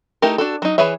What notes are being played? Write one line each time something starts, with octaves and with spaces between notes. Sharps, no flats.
A3 D#4 E4 G4 A#4
D4 F#4 A4
F#3 D#4
E3 G#4 B4 C#5 E5